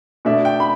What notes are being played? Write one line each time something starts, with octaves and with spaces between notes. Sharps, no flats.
B2 A3 D4 E5
G5
B5